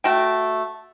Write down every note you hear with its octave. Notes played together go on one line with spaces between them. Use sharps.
A3 F#4 G5